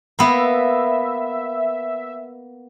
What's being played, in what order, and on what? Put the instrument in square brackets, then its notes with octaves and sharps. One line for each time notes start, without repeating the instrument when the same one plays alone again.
[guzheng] A#3 B3 [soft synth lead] E5